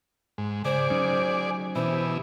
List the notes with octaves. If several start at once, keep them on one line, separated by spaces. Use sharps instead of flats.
G#2
C#3 G#4 C5 D5
F#3 C#4 D#4
B2 E3 C5
G4